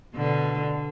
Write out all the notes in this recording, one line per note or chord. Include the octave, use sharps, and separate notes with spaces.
B2 D3